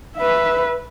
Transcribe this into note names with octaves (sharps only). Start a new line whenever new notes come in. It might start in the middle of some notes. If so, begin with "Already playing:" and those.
B4 E5